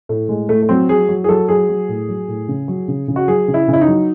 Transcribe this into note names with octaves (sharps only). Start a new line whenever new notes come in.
A2 A3
A2 G#3
A2 A3
A3
F#3 C4
F#3 G#4
F#3
G#4
F#3 A4
F#3 G#4
F#3
A2
F#3
A2
C#3
F#3
C#3
C#3
F#4
F#3 G#4
C#3
E4
C#3
E4
D#4
F#3